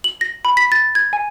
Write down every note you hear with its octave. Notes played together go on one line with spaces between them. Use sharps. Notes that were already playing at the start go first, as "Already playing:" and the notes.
F#7
A#6
B5
B6
A6
G#6
G#5